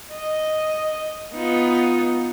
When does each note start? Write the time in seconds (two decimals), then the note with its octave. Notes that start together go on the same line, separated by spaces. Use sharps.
0.12 D#5
1.35 B3 D#4 F4